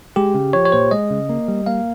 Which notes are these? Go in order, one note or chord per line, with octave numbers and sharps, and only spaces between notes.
G#3 G4
C#3
F3 C#5
C#5
A#2 C5
G#3 D#5
C#3
A#3
G3
A#3 F5